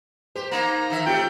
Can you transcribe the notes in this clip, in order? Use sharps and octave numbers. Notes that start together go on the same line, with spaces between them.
G4 C5
A#3 D#4 A#5
D#3 E3 E5
C3 A3 F4 G4 G5